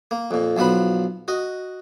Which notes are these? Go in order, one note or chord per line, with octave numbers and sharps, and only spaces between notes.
A#3
F2 A#2
B1 F3 F#3 B4 B5
F#4 D#5